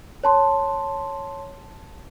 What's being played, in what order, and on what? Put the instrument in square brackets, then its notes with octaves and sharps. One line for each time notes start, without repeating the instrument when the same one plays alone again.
[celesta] C#5 A5 C6